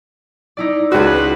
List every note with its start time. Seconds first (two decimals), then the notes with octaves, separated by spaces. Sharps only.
0.57 D#4 E4 D5
0.92 C#2 F#4 G#4 B4